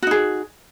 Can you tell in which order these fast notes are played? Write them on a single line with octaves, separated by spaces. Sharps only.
F#4 D#4 G#4